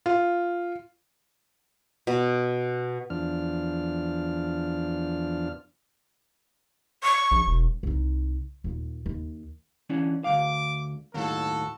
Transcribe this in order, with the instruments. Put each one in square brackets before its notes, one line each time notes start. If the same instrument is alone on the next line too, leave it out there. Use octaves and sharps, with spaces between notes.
[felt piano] F4
[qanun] B2
[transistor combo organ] E2 F3 D4 F6
[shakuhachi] C#6
[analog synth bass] A#1
E1
[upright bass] C2 D#4
D#2 A#2
D#2
[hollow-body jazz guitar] E3 C#4 D4
[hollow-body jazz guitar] D2 D#3 F5 [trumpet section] D6
[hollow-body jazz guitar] D#2 A2 [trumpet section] F#4 A4